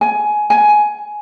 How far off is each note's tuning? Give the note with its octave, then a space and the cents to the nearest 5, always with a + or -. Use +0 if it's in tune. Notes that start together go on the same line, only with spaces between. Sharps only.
G#5 +20
G#5 +10